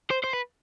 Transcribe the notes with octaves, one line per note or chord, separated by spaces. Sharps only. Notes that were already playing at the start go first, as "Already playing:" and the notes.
C5
C5
B4